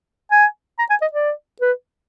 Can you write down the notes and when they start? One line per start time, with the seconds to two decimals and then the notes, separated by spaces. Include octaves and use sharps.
0.32 G#5
0.79 A#5
0.90 G#5
1.02 D#5
1.13 D5
1.61 B4